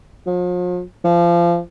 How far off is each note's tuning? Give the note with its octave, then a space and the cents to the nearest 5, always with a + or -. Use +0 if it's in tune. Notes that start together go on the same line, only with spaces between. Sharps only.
F3 +40
F3 -25